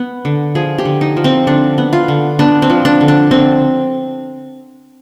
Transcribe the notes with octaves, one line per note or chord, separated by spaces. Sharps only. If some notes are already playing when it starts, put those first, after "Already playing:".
Already playing: B3
D3
F3 G#4
G4
D3
D#4
F3
C4
D3 D4
B3
F4
D3
B3 D4
C4
F3
D4
D3
D4
D3 C4